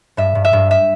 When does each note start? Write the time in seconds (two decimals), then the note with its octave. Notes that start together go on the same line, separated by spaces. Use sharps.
0.17 G2 E5
0.35 G2
0.45 E5
0.53 G2
0.71 E5